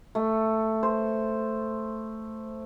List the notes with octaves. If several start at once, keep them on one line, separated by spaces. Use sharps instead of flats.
A3
C5